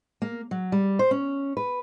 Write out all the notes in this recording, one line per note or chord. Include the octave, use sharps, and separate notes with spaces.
A#3
F#3
G3
C5
C#4
B4